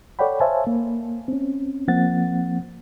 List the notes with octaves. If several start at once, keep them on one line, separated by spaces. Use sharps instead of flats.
A4 C#5 D5 F#5 G5 B5
C5 C#5 E5 F5 G#5 A5
A#3
C4 C#4
F3 A#3 C4 F#5 A6